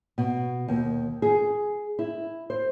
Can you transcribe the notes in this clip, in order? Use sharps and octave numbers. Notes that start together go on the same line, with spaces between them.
B2
D#2
G#4
E4
C5